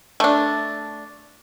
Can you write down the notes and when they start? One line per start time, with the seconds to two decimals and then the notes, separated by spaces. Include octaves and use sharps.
0.20 A3 D4